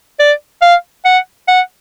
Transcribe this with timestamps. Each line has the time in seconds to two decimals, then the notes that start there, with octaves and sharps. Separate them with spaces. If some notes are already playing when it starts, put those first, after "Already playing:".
0.19 D5
0.62 F5
1.05 F#5
1.48 F#5